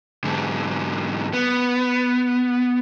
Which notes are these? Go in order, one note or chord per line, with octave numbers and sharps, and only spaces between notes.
G#2 D3
B3